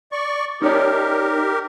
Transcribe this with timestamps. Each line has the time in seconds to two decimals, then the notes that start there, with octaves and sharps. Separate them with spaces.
0.12 D5 C#6
0.62 D#4 G4 A#4 C#5 D5